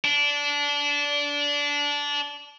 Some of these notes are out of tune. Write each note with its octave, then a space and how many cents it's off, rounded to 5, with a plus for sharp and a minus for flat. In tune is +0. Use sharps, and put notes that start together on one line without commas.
D4 -20